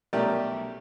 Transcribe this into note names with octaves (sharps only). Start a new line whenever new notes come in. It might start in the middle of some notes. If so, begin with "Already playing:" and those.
B1 G3 A3 G4 A#4 D5